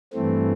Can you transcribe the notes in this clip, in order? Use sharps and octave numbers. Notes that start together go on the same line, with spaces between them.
G2 E3 A3 C4